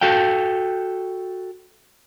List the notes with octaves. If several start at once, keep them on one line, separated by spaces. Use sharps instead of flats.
F#4 A4 F5 G5